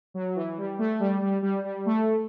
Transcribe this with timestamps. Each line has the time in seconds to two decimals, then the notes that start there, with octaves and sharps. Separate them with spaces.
0.14 F#3
0.36 E3
0.58 G3
0.79 A3
1.00 G3
1.22 G3
1.42 G3
1.64 G3
1.86 A3